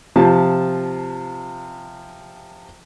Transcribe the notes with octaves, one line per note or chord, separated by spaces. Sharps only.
C3 F3 A5